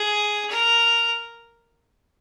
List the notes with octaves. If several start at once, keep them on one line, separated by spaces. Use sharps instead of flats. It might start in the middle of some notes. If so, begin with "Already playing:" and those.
Already playing: G#4
A#4